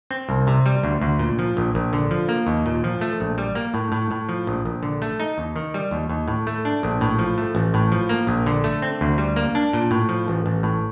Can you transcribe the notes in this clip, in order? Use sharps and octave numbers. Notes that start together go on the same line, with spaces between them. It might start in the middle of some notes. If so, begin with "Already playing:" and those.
C4
C2
C3
G3
D2
D2
A#2
F3
A#1
A#1
D3
F3
A#3
D#2
A#2
F3
A3
A#1
G3
A#3
A2
A2
A2
F3
A#1
A#1
D3
A3
D#4
D#2
D#3
G3
D#2
D#2
A2
A3
D4
A#1
A2
F3
A3
A1
A2
F3
A#3
A#1
D3
A3
C4
D2
G3
A#3
D4
A#2
A2
F3
A1
A1
A2